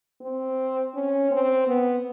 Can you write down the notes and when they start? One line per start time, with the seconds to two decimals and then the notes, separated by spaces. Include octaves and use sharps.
0.21 C4
0.94 C#4
1.31 C4
1.67 B3